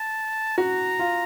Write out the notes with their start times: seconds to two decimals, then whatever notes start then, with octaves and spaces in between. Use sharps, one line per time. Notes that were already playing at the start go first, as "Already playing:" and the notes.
Already playing: A5
0.58 F#4 A#5
0.99 F4